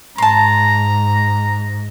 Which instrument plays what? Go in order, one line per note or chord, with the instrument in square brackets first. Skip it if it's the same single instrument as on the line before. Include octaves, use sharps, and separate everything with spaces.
[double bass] G#2 [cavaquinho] A5 C6 [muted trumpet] A#5